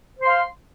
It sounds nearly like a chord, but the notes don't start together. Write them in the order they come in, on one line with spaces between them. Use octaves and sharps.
C5 C6 F5